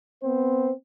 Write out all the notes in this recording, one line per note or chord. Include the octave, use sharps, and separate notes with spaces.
B3 C4 C5